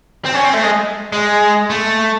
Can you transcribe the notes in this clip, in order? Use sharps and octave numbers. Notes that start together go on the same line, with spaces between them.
C4
C#4
C4
A3
G#3
G#3
A3